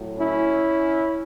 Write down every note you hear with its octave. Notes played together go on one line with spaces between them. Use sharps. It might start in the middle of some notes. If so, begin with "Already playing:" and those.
Already playing: A2 F#3
C#4 E4